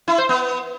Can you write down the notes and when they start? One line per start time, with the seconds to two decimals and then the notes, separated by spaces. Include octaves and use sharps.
0.08 E4
0.18 C5
0.29 B3